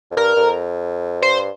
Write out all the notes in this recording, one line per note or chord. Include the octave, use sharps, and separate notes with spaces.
F2
G2 A#4
G2
F2
G2 C5